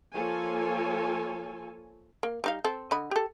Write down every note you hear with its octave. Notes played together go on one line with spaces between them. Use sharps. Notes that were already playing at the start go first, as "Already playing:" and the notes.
F3 A#3 F4 A4 C#5 G#5
A#3
G3 D#4 F5
C4 A4
D3 D#5 B5
G4 A4